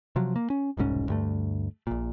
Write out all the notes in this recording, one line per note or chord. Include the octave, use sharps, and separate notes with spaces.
C3 F3 F#3
A#3
C#4
E1 C2 G#2 C#4
D2 G2 A3
A#1 A#2